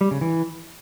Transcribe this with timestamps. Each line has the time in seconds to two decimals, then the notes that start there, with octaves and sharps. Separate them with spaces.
0.01 G3
0.11 C#3
0.21 E3